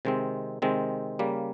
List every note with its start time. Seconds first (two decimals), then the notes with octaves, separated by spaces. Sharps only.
0.05 C3 D#3 G#3 C4
0.62 C3 D#3 G#3 C4
1.19 C#3 G3 A#3